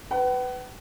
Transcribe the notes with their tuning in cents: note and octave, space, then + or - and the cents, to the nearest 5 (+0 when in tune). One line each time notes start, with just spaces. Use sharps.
B4 +15 F#5 +45